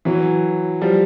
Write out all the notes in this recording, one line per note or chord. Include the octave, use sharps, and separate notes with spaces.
E3 F#3
F3 G3